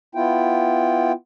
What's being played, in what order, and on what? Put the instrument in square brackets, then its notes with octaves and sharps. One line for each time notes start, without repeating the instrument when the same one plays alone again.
[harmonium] B3 E4 F4 G5